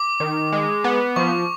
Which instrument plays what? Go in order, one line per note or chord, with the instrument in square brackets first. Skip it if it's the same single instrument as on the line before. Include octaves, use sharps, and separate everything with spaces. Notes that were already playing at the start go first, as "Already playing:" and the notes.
Already playing: [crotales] D6
[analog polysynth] D#3
G#3
B3
[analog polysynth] F3 [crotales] C#6